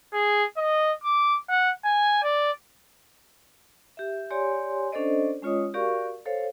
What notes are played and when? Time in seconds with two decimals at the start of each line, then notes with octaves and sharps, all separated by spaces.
0.13 G#4
0.57 D#5
1.04 D6
1.49 F#5
1.85 G#5
2.23 D5
3.97 G4 E5
4.30 G4 C#5 D5 G#5 C6
4.92 C#4 D4 A4 C5 D5 D#5
5.42 G#3 C#4 F4 C#5 D#5 D#6
5.74 F#4 G4 A#4 D5 F5 C#6
6.26 A4 C5 C#5 F5